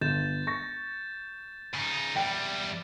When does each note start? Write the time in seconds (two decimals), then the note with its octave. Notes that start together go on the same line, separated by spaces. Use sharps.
0.01 G1 G6 A6 E7
0.47 C#6 A#6
1.74 C#3 D#4
2.16 E2 G3 G5